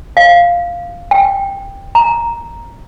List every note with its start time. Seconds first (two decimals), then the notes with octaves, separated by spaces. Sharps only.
0.17 F5
1.11 G5
1.95 A#5